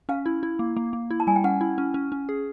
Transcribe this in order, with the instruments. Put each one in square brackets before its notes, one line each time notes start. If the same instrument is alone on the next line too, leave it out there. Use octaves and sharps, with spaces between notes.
[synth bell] C#4 [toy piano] F5
[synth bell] E4
E4
A#3
A#3
A#3
E4
[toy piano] A5
[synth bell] G3 [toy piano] G#5
[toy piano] G5
[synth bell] C#4 [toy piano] F#5
[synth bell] E4
C#4
C#4
C#4
G#4